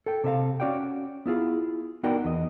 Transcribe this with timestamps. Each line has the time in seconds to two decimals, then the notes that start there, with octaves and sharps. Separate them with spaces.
0.06 A4 G5
0.24 C3 A4 E5 F5
0.60 C#4 F#4 D5 F5 G5
1.26 B3 E4 F4 G#4
2.03 B3 D#4 F#4 A#4 D5 G5
2.25 E2 D#5